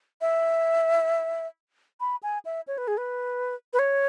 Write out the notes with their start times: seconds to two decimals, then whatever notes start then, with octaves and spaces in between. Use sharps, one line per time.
0.21 E5
2.00 B5
2.23 G#5
2.45 E5
2.67 C#5
2.78 B4
2.88 G#4
2.97 B4
3.73 B4
3.79 C#5